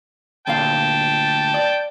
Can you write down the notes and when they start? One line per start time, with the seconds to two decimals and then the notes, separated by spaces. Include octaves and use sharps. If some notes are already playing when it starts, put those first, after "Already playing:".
0.47 D2 A#2 F5 G5 A5
1.54 D5